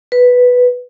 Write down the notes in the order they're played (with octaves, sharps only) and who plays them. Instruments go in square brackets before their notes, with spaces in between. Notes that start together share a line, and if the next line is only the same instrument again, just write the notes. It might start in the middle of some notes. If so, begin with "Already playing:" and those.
[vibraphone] B4